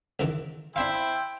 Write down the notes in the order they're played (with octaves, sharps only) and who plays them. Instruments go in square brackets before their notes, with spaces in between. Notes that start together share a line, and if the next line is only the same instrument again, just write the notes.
[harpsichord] C#2 D#3 E3
[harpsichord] D4 E5 F5 [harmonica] E4 C5 [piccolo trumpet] G5